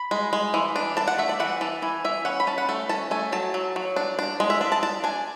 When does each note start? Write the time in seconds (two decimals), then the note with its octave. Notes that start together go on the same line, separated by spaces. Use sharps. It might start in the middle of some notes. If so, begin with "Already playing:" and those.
Already playing: B5
0.11 G#3
0.33 G#3
0.54 E3
0.76 D4
0.97 D4 A5
1.08 F#5
1.18 A3 E5
1.29 D5
1.40 E3 F#5
1.61 E3 A5
1.82 E3 G#5
2.04 E3 E5
2.25 C#4 F#5
2.40 B5
2.47 C#4 A5
2.58 F#5
2.69 A3 A5
2.89 C#4 A5
3.11 A3 G#5
3.32 F#3 A5
3.54 F#3
3.76 F#3
3.96 D4
4.19 D4
4.40 G#3
4.50 E5
4.61 D4
4.72 A5
4.83 D4 A5
5.04 D4 G#5